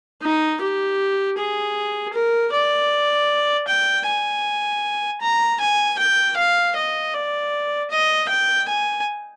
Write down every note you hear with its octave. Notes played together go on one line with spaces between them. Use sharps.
D#4
G4
G#4
A#4
D5
G5
G#5
A#5
G#5
G5
F5
D#5
D5
D#5
G5
G#5